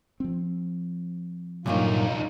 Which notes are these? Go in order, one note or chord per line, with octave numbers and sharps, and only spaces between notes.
F3 C4
C2 G2 A#2 F#3 A#3 D#4 F4